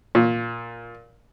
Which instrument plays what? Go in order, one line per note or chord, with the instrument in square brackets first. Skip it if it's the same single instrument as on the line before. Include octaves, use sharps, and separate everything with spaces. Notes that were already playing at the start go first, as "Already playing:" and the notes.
[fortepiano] A#2